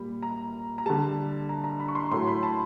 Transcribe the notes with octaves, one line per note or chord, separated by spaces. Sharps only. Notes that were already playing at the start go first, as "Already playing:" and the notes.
Already playing: A#2 G3 B5
A#5
A#5
D3 G3 A5
A#5
A#5
B5
C#6
C6
A2 F#3 A3 C6
B5
A5